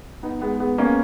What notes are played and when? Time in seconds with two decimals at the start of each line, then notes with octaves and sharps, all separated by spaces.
0.23 B3 D#4
0.42 G#3 B3
0.60 G#3 B3
0.78 A#3 C#4